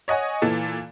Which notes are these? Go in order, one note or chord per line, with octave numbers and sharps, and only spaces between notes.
C#5 D#5 F#5 G#5
A#2 E3 A4